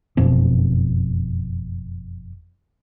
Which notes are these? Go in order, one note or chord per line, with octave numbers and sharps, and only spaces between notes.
F#1 F2 B2 C4